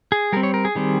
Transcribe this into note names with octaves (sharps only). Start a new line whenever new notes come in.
G#4
G3 C4 A#4
C#5
A#4
G#4
D#3 G3 C4